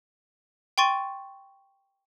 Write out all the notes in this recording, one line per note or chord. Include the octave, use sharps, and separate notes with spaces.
G5 C6 C#6 A6 D#7